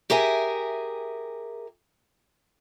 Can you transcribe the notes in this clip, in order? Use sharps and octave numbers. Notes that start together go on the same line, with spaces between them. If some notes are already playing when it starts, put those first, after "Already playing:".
G4 G#4 A#4 E5 G#5